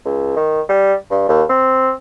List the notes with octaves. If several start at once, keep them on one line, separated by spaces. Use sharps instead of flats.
C#2
D#3
G3
G2
D#2
C4